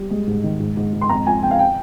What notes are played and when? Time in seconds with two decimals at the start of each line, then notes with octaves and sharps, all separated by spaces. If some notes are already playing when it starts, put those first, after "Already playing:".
Already playing: G3
0.10 G#3
0.27 G#2
0.43 D#3
0.60 G#2
0.77 G#2
0.92 G#2
1.01 C6
1.09 F2 A#5
1.27 F3 G#5
1.43 F2 G5
1.51 F5
1.59 G5